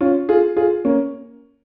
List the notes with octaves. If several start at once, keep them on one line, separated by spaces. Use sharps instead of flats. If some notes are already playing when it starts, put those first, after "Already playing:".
C#4 F4
F4 G#4
F4 G#4
A#3 C#4